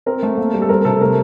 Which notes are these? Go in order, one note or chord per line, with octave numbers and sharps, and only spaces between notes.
C4 A#4
A3
A#3
G3
A4
C4 A#4
C3 A4
A3 A#4